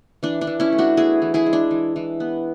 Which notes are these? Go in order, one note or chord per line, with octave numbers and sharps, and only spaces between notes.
E3 D4
D4
E3
C#4 E4
A3
D4 F#4
B3 E4 G#4
E3
E4 G#4
G#3
D4
E3
E3
B3